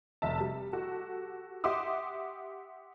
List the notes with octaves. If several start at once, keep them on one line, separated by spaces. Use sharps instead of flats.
F1 E5 A5
G3
F#4 G4 A4
G4 E5 F#5 C6 D6 D#6